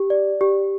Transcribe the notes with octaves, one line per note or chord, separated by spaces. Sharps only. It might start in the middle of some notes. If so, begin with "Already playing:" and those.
Already playing: G4
D5
G4